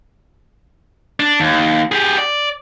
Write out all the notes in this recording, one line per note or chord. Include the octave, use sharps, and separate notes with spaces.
D4
D#2
G4 G#4
D5